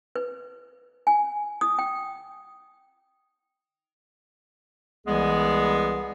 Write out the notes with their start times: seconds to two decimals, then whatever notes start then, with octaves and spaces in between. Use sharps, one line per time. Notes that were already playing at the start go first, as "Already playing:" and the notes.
0.16 B4
1.07 G#5
1.61 D#6
1.79 G5
5.06 C2 E3 G3 G#3 B3 G#4